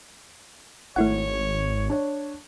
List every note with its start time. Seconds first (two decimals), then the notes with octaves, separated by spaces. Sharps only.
0.96 G#1 A3 E4 C#5 F#5
1.90 D4 C#5